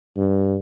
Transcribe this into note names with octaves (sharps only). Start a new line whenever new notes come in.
G2